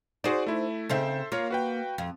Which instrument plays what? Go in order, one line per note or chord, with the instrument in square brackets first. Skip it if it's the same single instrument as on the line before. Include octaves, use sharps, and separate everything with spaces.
[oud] D#4 C5 [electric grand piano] F#4 G#4 D5
[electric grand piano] A3 E4
[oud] C#3 C4 D#4 [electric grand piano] A4 C5 E5
[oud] A#3 [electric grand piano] F4 A#4 C#5
[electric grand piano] F#4 B4 G5
[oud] F2